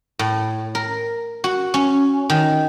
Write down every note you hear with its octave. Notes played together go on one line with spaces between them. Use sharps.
A2
A#4
F#4
C#4
D#3